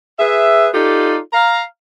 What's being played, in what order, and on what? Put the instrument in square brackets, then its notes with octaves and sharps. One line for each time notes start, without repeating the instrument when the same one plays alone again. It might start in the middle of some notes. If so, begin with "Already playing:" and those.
[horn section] G#4 B4 E5
D#4 F4 G4 A4 D5
F5 A#5